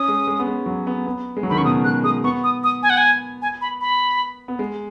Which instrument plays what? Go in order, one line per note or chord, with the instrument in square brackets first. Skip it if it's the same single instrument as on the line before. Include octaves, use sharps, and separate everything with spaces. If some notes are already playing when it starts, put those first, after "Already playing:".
Already playing: [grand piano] C#4 [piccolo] D#6
[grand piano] G#3
G#3
B3
G#3
F#3
B3
B3
G#3
F#3
[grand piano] D#3 [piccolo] B5
[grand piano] C#3 [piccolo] C#6
[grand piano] B2 [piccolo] D#6
[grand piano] G#3 [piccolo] F#6
[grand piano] G#3 [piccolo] D#6
[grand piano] B3 [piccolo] C#6
[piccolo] D#6
D#6
G#5
F#5
G#5
G#5
B5
B5
[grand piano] B3
G#3